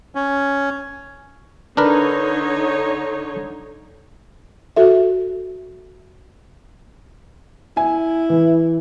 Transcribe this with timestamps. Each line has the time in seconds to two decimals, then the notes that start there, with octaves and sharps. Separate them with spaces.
0.15 C#4
1.77 D3 D4 D#4 A#4 B4 C#5
4.76 F#4 A4 E5
7.77 E4 G#5
8.29 E3